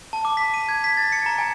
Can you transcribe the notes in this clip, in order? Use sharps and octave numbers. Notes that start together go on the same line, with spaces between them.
A5
D6
B6
D#7
G#6
B6
A6
C#7
A#5
G#5